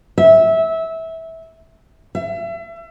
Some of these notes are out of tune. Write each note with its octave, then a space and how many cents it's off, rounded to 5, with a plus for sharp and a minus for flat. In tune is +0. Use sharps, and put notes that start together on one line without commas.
E5 -20
E5 +35